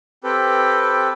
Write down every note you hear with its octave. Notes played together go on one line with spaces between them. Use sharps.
C4 G4 A4 B4